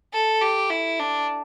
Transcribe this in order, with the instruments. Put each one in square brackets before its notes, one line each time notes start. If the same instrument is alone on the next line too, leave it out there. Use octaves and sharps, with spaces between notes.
[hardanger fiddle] A4
G4
E4
D4